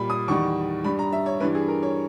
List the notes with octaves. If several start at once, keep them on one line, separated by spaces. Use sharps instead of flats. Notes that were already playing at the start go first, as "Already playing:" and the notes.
Already playing: A#2 G3 B5
D#6
E2 D#3 G3 C#6
G2 G3 B5
A#5
E5
C#5
G2 E3 G3 B4
G#4
A#4
C#5